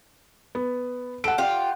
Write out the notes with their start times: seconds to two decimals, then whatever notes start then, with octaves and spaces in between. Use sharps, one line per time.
0.55 B3
1.24 A4 F#5 D7
1.38 F4 G4